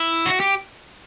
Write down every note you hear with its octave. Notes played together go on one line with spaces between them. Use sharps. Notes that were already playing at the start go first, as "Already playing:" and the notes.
Already playing: E4
F#4
G4